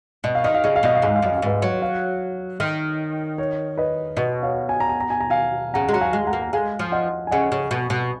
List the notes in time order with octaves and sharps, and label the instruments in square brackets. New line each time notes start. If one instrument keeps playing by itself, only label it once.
[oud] B2 [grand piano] D#5
[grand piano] F5
[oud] D#3 [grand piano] D#5
[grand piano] F5
[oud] C#3 [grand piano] D#5
[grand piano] F5
[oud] B2 [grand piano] D#5
[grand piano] F5
[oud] G#2 [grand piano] D#5
[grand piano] F5
[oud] F#2 [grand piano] D#5
[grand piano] F5
[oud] G#2 [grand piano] B4 D#5
[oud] F#3
[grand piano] C#5 F5
[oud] D#3
[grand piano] C#5
B4 D#5
[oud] B2 [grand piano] B4 D#5
[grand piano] C#5 F5
G#5
A#5
G#5
A#5
G#5
A#5
F5 G#5
[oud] C#3 [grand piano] F#5 A#5
[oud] G#3
[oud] F#3 [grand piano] A#5
[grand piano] F5 G#5
[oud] G#3
[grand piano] F#5 A#5
[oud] A#3
[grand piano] A#5
[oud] G#3 [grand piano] F5 G#5
[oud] F3
[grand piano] D#5 F#5
G#5
[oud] C#3 [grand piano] D#5 F#5
[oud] C#3
B2
B2